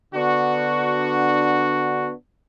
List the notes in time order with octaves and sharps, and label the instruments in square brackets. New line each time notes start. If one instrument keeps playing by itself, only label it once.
[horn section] D3 B3 D4 F#4